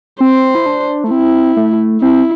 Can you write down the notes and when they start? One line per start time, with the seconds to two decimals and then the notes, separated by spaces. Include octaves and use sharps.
0.20 C4 C5
0.55 E4
0.66 D4
1.04 A3
1.11 C4 E4
1.57 A3
2.01 C4 E4